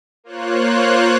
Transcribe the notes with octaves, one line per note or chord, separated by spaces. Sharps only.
A#3 F4 C5 C#5 F#6